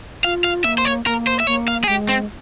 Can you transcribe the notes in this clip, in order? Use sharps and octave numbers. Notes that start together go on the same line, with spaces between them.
F4 F5
F5
A#3 E5
C5
C#5
A#3 A#4
C5
E5
A#3 C#5
F5
G#4
G#3 G4
C4